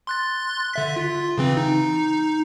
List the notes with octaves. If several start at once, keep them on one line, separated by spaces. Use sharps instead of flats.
C6 F#6 A6
D3 E5 B6
F4
C#3 E3 C4
D#4